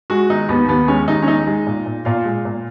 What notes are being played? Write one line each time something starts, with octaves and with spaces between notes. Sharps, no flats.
G#3 F#4
D#3 D#4
D#2 B3
D#2 B3
G#3 C#4
D#2 D#4
C#4
G#3 D#4
G#3
A#2
A#2
A#2 F4
G#3
A#2